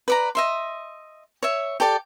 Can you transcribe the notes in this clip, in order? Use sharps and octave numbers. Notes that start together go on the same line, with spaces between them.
B4 D5 A#5
D#5 E5 C6
C#5 E5
G4 A4 D5 G5